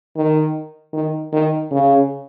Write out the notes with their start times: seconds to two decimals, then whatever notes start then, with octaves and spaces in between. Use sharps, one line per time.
0.16 D#3
0.93 D#3
1.32 D#3
1.71 C#3